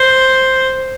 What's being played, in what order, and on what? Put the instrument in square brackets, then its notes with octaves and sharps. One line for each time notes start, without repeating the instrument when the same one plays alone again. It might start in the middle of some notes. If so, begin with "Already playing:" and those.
Already playing: [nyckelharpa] C5